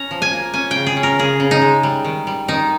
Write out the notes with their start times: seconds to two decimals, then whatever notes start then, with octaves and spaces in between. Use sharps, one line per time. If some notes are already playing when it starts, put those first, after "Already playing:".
Already playing: C#4 A#5
0.11 F3
0.22 G#5
0.33 A#3
0.54 C#4 G#5
0.71 C#3 G5
0.87 G#4
0.97 C#4
1.03 A#4
1.19 C#3 G#4
1.40 C#3
1.51 D#4
1.62 G#3
1.83 G3
2.05 D#3
2.27 G3
2.48 D#3 D#4